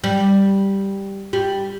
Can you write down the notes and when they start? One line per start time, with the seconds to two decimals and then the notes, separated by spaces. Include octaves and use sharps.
0.04 G3
1.33 G3